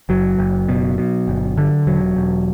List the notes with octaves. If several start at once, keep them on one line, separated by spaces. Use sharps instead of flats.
F#1 F#3
F#1
B2
B2
G1
D3
E1 F#3
E1